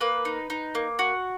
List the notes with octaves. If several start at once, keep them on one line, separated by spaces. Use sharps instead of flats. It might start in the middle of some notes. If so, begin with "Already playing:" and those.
A#3 B4
D#4
D#4
A#3
F#4